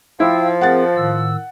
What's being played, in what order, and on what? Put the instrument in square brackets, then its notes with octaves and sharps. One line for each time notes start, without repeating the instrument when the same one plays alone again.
[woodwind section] F3 [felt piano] E4 [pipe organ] F5 G5 E6
[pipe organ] C4 G#4 A#4 [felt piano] F#5 A6
[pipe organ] A2 D#3 E6